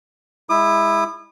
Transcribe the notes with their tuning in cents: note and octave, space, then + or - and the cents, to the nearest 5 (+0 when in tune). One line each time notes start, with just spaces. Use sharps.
G#3 -20 E4 +0 D#6 -40